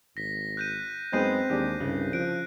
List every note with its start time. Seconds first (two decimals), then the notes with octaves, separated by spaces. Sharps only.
0.17 G#1 A#6 B6
0.57 F#6 G6 D#7
1.13 F#2 G#3 B3 C4 D#4 G6 C7 D#7
1.50 D#2 G#3 D4 G4
1.80 C2 G2 C#3
2.13 F3 F#6 D7